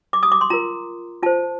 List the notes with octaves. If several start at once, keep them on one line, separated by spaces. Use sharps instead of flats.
D6
D#6
D6
C6
F4 A#4 A#5
F4 C5 A5